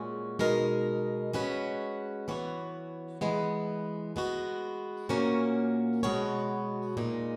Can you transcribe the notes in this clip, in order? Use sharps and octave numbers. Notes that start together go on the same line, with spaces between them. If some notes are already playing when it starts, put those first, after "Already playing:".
Already playing: A#2 G#3 C#4 F#4
B2 G#3 D#4 A#4
G#3 C#4 F#4 B4
E3 B3 F#4 C#5
E3 G#3 B3
G#3 B3 F#4
A#2 A#3 C#4 F#4 A#4
B2 G#3 B3 F#4 C#5
A#2 G#3 D#4